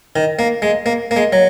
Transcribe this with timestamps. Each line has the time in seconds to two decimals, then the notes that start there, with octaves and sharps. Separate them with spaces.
0.16 D#3
0.39 A#3
0.62 G#3
0.86 A#3
1.11 A#3
1.16 G#3
1.33 F#3